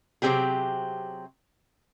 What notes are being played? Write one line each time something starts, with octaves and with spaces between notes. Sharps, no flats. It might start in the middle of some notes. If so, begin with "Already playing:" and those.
C3 F#3 G#3 C4 G4 G#4